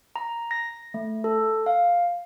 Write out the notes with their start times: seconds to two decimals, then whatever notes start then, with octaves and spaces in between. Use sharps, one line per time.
0.16 A#5
0.51 A#6
0.94 A3
1.24 A4
1.66 F5